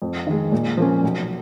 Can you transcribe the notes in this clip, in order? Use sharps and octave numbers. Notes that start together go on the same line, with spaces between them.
F2
D#3 G#3
A#2
F3 A#3 C#4
B1